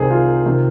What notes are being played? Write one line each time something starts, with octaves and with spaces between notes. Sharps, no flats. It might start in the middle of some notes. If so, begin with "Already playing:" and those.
Already playing: C2 C3 D#3 G#4 C5
F4
C3 D#3